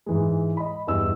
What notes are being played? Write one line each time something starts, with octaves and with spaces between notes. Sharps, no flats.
G#2 E3 G#3
D#5 B5
E2 G2 E3 D#5 E6